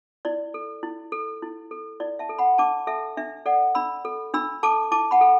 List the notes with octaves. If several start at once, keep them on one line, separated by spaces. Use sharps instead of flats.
E4 D5
A4
E4
A4
E4
A4
E4 D5
E5 A5
A4
F#5 B5
D4 A5 D6
A4 E5 A5
D4 E5
A4 D5 F#5
D4 B5 E6
A4
D4 B5 E6
A4 A5 D6
E4 A5 D6
F#5 B5
A4